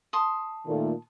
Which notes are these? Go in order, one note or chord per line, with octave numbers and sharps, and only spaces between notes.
A5 C6 D#6
A#2 D#3 A3